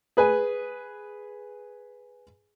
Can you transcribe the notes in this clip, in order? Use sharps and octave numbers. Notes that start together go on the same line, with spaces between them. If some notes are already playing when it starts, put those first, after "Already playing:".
G#4 B4 G#5